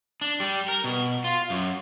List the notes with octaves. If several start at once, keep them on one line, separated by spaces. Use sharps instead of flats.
D4
G3
A#4
B2
F4
F#2